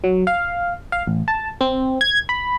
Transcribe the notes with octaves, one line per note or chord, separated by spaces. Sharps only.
F#3
F5
F5
A1
A5
C4
G#6
B5